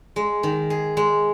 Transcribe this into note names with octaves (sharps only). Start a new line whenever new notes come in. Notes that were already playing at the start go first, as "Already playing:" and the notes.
G#3
D#3
G#4
G#3